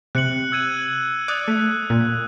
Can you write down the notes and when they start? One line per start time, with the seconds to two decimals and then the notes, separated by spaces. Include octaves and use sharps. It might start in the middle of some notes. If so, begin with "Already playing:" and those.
0.15 C3 F#6 C#7 F#7
0.52 E6 G#6 D#7
1.28 D5 D#6 F#6
1.48 A3
1.90 A#2